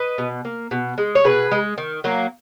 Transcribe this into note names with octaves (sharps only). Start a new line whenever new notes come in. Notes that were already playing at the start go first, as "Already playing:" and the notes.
Already playing: B4 D#5
B2
A#3
B2
G#3
C#5
B2 G#4 B4
G#3
D#3
F#3 A#3